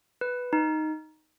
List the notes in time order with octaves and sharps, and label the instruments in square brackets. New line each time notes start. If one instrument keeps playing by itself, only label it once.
[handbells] B4
D#4